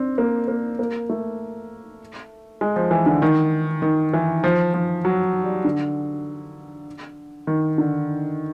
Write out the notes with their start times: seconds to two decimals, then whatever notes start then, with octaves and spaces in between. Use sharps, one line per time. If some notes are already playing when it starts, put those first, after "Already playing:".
Already playing: C4 D4
0.18 A#3
0.48 A#3
0.79 A#3
1.09 A3
2.61 G#3
2.76 F3
2.91 E3
3.06 D3
3.22 D#3
3.82 D#3
4.13 E3
4.44 F3
4.74 F3
5.05 F#3
5.44 G3
5.64 D3
7.47 D#3
7.78 D3